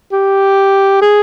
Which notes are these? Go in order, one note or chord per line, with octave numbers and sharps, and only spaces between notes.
G4
G#4